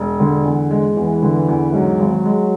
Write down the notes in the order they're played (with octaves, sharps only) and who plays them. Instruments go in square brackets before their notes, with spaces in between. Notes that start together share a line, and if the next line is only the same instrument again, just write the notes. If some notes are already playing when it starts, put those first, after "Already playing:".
Already playing: [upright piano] E1
D3
E2
G#3
[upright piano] E2 [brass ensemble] E3
[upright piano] D3
E2
[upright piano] G#2 [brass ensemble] F#3
[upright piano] G#1
G#3